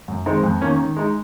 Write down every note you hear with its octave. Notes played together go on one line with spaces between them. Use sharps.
F#2
D#3 G#3 C4 D#4
F2
D#3 A#3 C#4
D#3
G#3 D#4